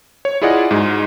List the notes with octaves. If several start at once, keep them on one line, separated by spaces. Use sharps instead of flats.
C#5
E4 F4 G#4 D5 D#5 F#5
G#2 G#3 D#4 F#4